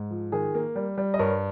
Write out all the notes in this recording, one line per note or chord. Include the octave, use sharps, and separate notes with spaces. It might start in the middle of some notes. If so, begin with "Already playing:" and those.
Already playing: G#2
F3
D#3 G#4
A#3
G3
G3
D#5
G2 A#4 C#5